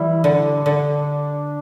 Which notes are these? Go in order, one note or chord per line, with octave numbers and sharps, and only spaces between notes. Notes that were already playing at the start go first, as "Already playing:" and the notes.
Already playing: E3 G3 E4
D3 D4
D3